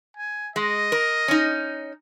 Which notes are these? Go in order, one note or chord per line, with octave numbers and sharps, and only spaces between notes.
G#5
G#3 D#5
A#4
C#4 D#4